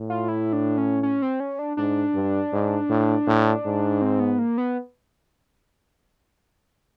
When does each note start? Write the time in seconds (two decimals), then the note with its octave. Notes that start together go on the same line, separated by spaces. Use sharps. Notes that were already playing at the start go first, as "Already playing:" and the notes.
Already playing: A2
0.10 F4
0.28 E4
0.53 D4
0.78 C#4
1.03 C#4
1.22 C4
1.40 C#4
1.59 D4
1.77 G#2 D4
2.14 G2
2.52 G#2
2.89 A2
3.27 A2
3.65 G#2
4.02 C4
4.20 B3
4.39 A#3
4.58 B3